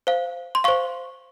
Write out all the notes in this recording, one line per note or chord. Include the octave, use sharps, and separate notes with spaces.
C5 F5
C6
C5 F5 C#6